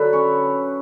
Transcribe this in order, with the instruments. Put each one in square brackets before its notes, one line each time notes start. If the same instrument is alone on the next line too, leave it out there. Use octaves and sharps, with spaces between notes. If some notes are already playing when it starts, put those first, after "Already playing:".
Already playing: [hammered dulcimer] D3 F#3 A4 B4
C#4 C#5